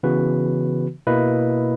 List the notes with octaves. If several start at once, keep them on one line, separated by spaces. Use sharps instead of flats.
C#3 E3 B3 F#4 B4
B2 A#3 E4 B4 D#5